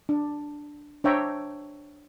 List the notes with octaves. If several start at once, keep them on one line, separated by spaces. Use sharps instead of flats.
D4
D4 C5 C#5 E5 G5 A#5